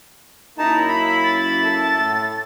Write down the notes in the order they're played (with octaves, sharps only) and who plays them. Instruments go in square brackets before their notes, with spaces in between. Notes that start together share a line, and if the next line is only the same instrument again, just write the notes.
[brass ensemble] F#2 A#3 E4 [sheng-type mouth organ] D#4 A5 [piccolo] A#5
[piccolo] E5 [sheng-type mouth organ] B5
[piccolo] A6
[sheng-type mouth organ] A4
[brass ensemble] A2